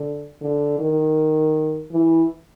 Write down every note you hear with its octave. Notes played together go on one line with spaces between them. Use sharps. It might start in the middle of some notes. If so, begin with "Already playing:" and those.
Already playing: D3
D3
D#3
E3